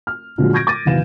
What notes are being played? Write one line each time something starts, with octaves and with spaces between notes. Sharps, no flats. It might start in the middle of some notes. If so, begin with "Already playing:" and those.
F6
A#2 D3 F3 F#3 G#3 F#4
C#6 G6 G#6 A#6 D7
D6 A6 D#7
F#1 B2 D#3 E3 F5 E7